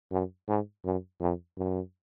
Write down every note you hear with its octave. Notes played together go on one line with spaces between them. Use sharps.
F#2
G#2
F#2
F2
F#2